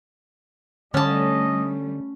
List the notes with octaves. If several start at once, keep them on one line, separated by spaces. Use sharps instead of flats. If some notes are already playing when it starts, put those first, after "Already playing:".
D3 G3 A3 C#4 D#5 A5